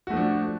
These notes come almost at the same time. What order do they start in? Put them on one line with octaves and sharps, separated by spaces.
F#4 A3 F3 D4